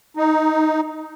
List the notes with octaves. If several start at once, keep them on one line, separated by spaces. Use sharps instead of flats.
D#4